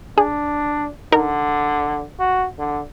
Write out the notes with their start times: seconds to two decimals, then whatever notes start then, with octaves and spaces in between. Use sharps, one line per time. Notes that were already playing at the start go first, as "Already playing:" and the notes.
0.18 D4 G#4
1.12 D3 D#4 A#4
2.19 F#4
2.59 D3